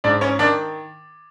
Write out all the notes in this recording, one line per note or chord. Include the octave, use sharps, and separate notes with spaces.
G#2 D4 D5
C#4 C#5
D#3 D4 D5